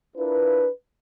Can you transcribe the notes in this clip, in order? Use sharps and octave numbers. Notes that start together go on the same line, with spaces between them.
D4 E4 F4 A#4 B4